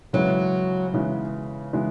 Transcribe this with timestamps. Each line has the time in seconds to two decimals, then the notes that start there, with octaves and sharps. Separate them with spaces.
0.13 C#3 E3 F#3 G#3 B3
0.94 C#3 E3 G#3 B3
1.73 C#3 E3 G#3 B3